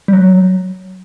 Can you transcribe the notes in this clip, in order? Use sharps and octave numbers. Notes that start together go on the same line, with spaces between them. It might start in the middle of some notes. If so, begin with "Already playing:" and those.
G3
F#3